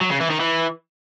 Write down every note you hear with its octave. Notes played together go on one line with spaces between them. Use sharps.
F#3
C#3
E3
D#3
E3